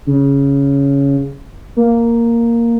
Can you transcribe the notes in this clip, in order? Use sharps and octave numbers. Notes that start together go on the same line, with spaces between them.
C#3
A#3